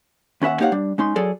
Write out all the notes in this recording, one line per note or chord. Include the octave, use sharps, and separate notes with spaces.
D#2 C#4 B4 E5 F#5
A#3 D#4 G4 C#5 F5 F#5
G3 D4
G#3 C#4 D#4 C6
F#3 G#4 A4 D5